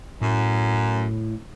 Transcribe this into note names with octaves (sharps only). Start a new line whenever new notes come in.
F#2 A2